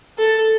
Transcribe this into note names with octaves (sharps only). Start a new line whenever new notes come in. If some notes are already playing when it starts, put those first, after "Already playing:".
A4